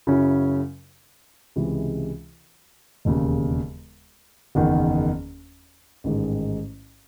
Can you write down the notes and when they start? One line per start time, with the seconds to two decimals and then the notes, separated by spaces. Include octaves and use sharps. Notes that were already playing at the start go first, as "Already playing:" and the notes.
0.07 F#2 C#3 F#3 C#4 E4
1.56 C#2 C3 E3 G#3
3.05 E1 D#2 C#3
4.55 F#1 E2 D#3
6.04 A1 G#2 D#3 G#3